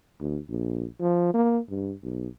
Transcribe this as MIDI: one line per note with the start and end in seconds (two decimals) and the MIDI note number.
0.21 0.39 38
0.49 0.85 34
1.00 1.32 53
1.34 1.59 58
1.70 1.94 43
2.03 2.28 35